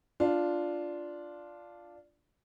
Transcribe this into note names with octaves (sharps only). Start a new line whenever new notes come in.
D4 F4